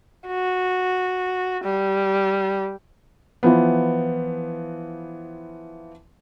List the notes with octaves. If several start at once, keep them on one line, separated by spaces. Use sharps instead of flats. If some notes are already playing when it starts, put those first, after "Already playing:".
F#4
G3
E3 F3 B3